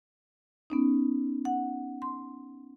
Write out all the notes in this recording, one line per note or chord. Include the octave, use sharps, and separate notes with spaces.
B3 C#4 D#4
F#5
C6